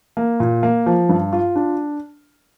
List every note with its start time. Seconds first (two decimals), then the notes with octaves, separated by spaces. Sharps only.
0.17 A#3
0.40 A#2
0.63 A#3
0.86 F3
1.09 G2
1.33 F4
1.56 D4